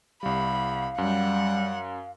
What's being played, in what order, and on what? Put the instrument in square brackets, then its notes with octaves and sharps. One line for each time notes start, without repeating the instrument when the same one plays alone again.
[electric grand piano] C2 G3 [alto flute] F5 [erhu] B5
[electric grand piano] F#2 [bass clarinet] G3 [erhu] F#5